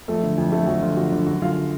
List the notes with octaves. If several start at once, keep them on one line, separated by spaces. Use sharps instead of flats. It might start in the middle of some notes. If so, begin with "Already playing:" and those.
F2 A3 A4
D3
F2
D3 A3 A4
F2 F#4
D3 F4
F2 F#4
D3
F#2 F#4
D3 F4 F5